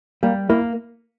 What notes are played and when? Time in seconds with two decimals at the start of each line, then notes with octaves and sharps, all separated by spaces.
0.23 G3 A#3
0.49 A#3 E4 A#4